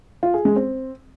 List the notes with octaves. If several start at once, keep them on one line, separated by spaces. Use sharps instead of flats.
F4
G#4
G#3
C4